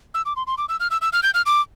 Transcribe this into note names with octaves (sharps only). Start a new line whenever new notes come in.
E6
D6
C6
C6
D6
E6
F6
E6
E6
F6
G6
F6
D6